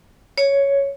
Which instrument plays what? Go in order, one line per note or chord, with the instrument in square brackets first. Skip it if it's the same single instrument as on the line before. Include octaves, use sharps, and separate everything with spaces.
[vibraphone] C#5